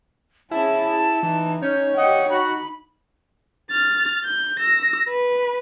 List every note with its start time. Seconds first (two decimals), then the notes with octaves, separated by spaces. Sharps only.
0.51 C#4 E4 G#4 A5
1.23 E3 D#4
1.62 C#4 C#5 G6
1.97 G4 D#5 F#5 G5
2.30 D#4 F#4 B5
3.71 F6 A6
4.24 G6
4.59 E6 A#6
5.10 B4